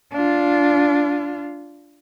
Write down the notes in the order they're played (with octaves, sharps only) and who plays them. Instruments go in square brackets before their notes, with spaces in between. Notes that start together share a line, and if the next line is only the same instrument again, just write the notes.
[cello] D4 F4